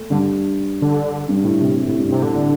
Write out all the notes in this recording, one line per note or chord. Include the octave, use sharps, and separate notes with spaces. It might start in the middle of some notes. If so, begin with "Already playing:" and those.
Already playing: A3
G2 D3
D3
G2
A2
C3
C3
A2
G2
A2 C3
A2 D3